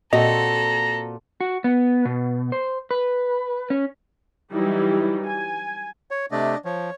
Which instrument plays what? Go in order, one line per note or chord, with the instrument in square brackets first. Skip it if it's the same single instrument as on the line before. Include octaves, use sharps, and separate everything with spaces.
[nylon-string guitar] A#2 C4 F#4 [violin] A4 [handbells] D#5 [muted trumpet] A#5
[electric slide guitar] F#4
B3
B2
C5
B4
C#4
[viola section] E3 F#3 G3 D#4 E4
G#5
[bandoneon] C#5
[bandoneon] C3 A3 [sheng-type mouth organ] D4 D5 D#5
[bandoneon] F3 [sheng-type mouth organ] C#5